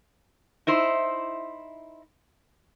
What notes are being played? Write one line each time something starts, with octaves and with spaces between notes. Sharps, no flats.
D#4 E4 C5